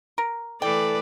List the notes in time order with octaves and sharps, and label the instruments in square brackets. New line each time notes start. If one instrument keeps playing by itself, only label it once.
[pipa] A#4
[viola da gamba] E3 A3 B4 [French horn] A4 [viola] D5 [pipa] G5